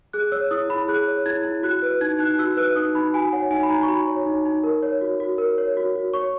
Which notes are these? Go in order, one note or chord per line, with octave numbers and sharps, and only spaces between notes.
G#4 F#6
C#5 E6
E4 D#6
E4 B5
G#4 F#6
C#5
E4 G#6
E4
F#4 F#6
B4
D#4 G#6
D#4 F#6
F#4 E6
B4 F#6
D#4 D#6
D#4 B5
F#4 G#5
C#5 F#5
D#4 G#5
B5
D#4 A#5
C#6
F#4 B5
C#5
D#4
D#4
A#4
C#5
F#4
F#4
A#4
C#5
F#4
F#4
C#5 C#6